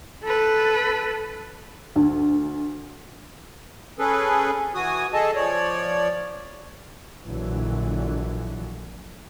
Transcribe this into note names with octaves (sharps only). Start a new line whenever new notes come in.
A4 B4
D2
C#4 G#4 A4 B4
E3 F#4 G#5 D#6
G#4 A4 D#5 A5
F3 C#5 D5
A#1 A#2 D3 E3 F#3